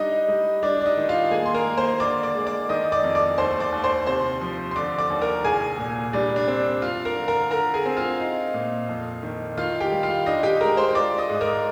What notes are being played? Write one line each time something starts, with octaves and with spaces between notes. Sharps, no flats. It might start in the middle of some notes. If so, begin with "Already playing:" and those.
Already playing: G3 D4 D#4 D#5
G3
G3 D4 D5
D5
D#4 D#5
D#3
F4 F5
A#3 G#4 G#5
C6
A#4 A#5
A#3
C5 C6
D3 D5 D6
D5 D6
G#3
D5 D6
D#3 D#5 D#6
D5 D6
F2
D5 D6
D#2 C5 C6
D5 D6
D#2
C5 C6
C3 C5 C6
F3
C6
D3 D5 D6
D5 D6
D#2
A#4 A#5
C2 G#4 G#5
A#2
G3 D4 D5
D4 D5
C4
F4 F5
A#4 A#5
D3
A#4 A#5
D3 A#4 A#5
G#4 G#5
C4
F4 F5
D#4
A#2
F2
D#3
D#3 F4 F5
G4 G5
G3
F4 F5
D4 D#4 D#5
G4 G5
G#3 A#4 A#5
C5 C6
F4 D5 D6
D#5 D#6
G#2
A#4 A#5